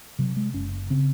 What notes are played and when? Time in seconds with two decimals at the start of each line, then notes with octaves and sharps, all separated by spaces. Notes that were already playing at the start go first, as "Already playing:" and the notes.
0.19 C3 F#3
0.36 G#3
0.54 F#1 C#4
0.90 C#3 C4